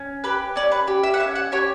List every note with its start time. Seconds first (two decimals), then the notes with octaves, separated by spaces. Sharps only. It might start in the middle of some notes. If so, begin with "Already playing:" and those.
Already playing: C#4
0.24 G4 B4
0.56 C#4 D5
0.72 B4
0.87 G4
1.03 E5
1.14 F#5
1.20 C#4 E5
1.35 F#5
1.52 G4 C#5